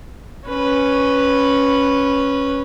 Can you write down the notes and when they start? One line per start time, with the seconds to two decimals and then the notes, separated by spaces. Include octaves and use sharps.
0.48 C#4 B4